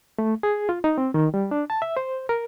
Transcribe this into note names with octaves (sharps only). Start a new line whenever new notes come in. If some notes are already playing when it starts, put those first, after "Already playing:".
A3
G#4
F4
D#4
C4
D#3
G3
D4
A5
E5
C5
A#4